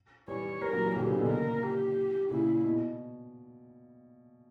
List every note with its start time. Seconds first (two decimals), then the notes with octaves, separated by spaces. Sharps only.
0.28 E3 G3 C#5
0.61 E3 G3 A#4
0.73 F#3 A#3
0.84 E3 G3
0.96 D3 F#3 G4
1.07 C#3 E3
1.19 B2 D3
1.29 A#2 C#3 A#4
1.63 G4
2.31 A#2 C#3 E4
2.65 B2